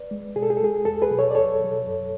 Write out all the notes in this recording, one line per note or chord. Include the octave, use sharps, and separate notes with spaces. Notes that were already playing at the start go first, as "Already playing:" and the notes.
Already playing: B4 D5
G#3
B2 G#4
A4
G#4
A4
G#3 G#4
E2 A4
G#4 B4
B2 F#3
A4 C#5
D5
E2 A4 C#5
B2 F#3
F#2